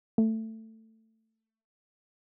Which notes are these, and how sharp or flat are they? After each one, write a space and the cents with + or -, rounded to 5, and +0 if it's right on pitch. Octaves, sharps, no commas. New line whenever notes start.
A3 +15